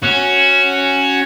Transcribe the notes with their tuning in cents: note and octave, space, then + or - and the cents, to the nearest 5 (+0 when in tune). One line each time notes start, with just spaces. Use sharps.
C#4 +0 F#4 +0